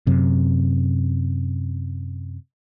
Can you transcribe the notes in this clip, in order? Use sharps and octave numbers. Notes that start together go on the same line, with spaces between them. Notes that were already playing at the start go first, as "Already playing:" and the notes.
F#2 C3